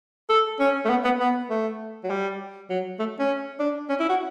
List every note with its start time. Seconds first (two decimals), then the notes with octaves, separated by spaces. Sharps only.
0.29 A4
0.60 C#4
0.85 A3
0.89 B3
1.04 B3
1.20 B3
1.50 A3
2.03 F#3
2.09 G3
2.69 F#3
2.99 A3
3.19 C#4
3.59 D4
3.89 C#4
3.99 E4
4.09 F#4